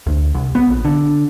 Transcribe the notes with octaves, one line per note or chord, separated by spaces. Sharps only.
D2
C2
B3
A#1
D3